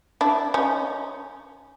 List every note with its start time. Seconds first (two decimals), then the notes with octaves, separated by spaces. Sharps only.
0.21 D4 E4
0.54 C#4 D#4